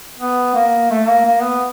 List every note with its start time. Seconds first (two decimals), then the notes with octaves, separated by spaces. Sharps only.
0.19 B3
0.55 A#3
0.90 A3
1.08 A#3
1.25 A#3
1.42 B3